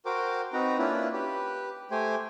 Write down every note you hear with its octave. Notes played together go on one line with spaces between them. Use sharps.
F#4 A#4 C5 G5 D6
C4 D#4 F#4 B4 A#5
A#3 C#4 D4 E4 F4 B4
G4 B4
A3 G4 C5 G5 G#5